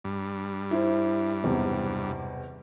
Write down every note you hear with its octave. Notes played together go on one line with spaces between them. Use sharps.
G2
E4 C5
B1 E2 C3